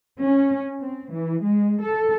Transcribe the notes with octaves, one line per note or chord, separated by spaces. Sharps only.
C#4
C4
E3
G#3
A4